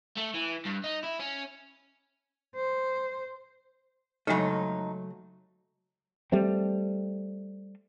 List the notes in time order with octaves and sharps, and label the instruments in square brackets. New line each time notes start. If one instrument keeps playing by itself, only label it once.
[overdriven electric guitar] A3
E3
G2
D#4
E4
C#4
[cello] C5
[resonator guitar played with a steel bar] F2 D#4 [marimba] C#3 G#3 [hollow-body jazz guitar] F#3 A3
[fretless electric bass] G3 A3 C4